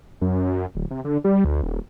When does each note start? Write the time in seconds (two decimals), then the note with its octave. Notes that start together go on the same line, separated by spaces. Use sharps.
0.21 F#2
0.75 D1
0.91 C3
1.05 D3
1.24 G3
1.45 D2
1.63 D#1